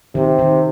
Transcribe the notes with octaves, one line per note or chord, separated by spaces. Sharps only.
C3 D#3
D#3